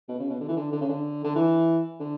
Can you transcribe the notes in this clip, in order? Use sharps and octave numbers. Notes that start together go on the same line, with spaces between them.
B2
C#3
B2
D3
E3
D3
D3
C#3
D3
D3
E3
D3